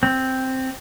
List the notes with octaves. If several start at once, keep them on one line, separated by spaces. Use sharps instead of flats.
C4